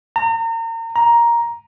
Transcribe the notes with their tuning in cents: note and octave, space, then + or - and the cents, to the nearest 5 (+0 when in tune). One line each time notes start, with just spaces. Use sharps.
A#5 -35
A#5 +10